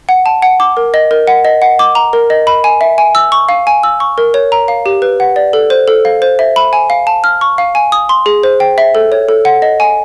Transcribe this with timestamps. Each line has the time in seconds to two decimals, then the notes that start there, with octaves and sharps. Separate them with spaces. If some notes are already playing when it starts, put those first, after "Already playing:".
0.09 F#5
0.26 A5
0.42 F#5
0.60 D6
0.77 A#4
0.94 D#5
1.11 A#4
1.27 F#5
1.45 D#5
1.62 F#5
1.79 D6
1.95 A#5
2.13 A#4
2.30 D#5
2.47 B5
2.64 G#5
2.81 E5
2.98 G#5
3.15 E6
3.32 C#6
3.49 F5
3.67 G#5
3.83 E6
4.00 C#6
4.18 A#4
4.34 C#5
4.52 A#5
4.68 F5
4.86 G4
5.02 B4
5.20 F#5
5.36 D5
5.53 A4
5.70 C5
5.88 A4
6.05 F5
6.22 C5
6.39 E5
6.56 B5
6.73 G#5
6.90 F5
7.07 A5
7.24 F6
7.41 C#6
7.58 F5
7.75 G#5
7.92 D#6
8.09 C6
8.26 G#4
8.43 C5
8.60 G5
8.78 E5
8.95 A4
9.12 C#5
9.29 A4
9.45 F#5
9.62 D#5
9.80 G#5